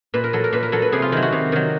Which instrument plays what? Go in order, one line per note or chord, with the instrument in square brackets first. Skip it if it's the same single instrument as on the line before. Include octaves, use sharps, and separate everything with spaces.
[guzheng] A#2 B4
A#4
F#3 A4
A#4
A#2 B4
A#4
F#3 A4
B4
C3 G#4
F4
D#3 E4
F#3
F#4
C3
D#3 F#3